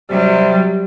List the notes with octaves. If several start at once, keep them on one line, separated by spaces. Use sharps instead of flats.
C3 F#3 G3